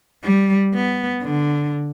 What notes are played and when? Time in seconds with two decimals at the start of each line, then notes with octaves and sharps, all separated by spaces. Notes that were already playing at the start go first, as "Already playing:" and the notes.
0.24 G3
0.75 B3
1.24 D3